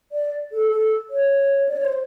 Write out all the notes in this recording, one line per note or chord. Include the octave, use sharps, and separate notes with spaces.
D5
A4
A4
C#5
D5
C#5
C5